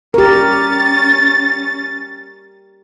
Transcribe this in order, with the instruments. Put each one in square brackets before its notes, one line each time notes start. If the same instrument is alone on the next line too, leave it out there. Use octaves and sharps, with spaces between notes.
[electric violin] C#4 A6 [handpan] G4 A#4